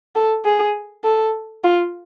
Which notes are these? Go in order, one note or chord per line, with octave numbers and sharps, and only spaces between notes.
A4
G#4
A4
F4